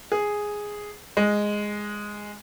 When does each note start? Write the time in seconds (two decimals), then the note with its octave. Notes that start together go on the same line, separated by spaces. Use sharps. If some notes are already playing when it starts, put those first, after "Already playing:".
0.12 G#4
1.17 G#3